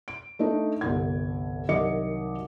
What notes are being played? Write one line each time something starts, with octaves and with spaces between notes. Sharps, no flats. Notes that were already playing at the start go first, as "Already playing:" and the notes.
D7
A3 D4 D#4
G1 C2 G#6
C2 D#3 F#3 D#5 D6 C#7